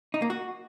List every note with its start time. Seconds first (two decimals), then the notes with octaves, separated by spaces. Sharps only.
0.14 D#4
0.22 A#3
0.30 F#4